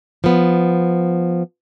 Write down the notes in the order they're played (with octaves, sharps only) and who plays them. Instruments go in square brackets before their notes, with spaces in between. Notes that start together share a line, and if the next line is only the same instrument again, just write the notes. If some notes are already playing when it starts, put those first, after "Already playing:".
[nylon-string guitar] F3 B3